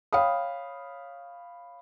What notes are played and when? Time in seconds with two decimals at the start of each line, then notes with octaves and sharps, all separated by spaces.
0.13 C#5 F5 G5 B5 D#6